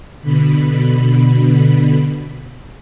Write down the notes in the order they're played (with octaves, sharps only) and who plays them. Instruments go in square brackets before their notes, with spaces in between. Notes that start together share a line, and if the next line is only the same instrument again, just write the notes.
[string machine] B2 D3 B5